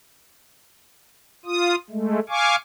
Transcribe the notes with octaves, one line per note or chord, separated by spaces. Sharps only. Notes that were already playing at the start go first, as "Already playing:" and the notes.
F4 D#6
G#3 A3
F5 G#5 C#6 D6